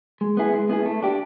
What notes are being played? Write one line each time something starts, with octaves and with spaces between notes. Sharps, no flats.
G#3
B3 E4 G#4
G#3
B3 E4 G#4
A3
D4 G4